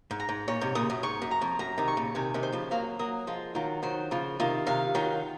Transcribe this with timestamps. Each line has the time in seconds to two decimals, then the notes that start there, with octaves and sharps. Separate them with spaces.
0.11 G#2
0.20 A#5
0.29 G#2
0.48 A#2 C#5
0.61 G#2 C3
0.75 A#2 C#3 D#6
0.90 F#2
1.03 G#2 C#6
1.22 F#2
1.31 A#5
1.42 F2
1.59 F#2 A#5
1.78 C3 D#3
1.88 C#6
1.97 A#2 C#3
2.15 C3 D#3 G#5
2.34 C3 D#3
2.43 C5
2.52 C#3 F3
2.71 F#3 A#3 F5
2.99 F#3 A#3 D#6
3.27 F3 G#3 F4
3.55 D#3 F#3 F4
3.83 D#3 F#3 C5
4.11 C#3 F3 F4
4.40 C3 D#3 F4
4.66 C3 D#3 F5
4.95 D#3 F#3 F4